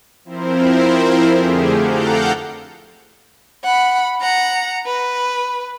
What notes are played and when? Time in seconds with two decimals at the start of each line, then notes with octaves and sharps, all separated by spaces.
0.25 F3 C4 E4 A#4 C5
1.31 F2 D3 A3 G4 G#4
1.75 A4 F5 F#5 A#5 D6 G6
3.64 F#5 B5
4.21 F#5 A#5
4.86 B4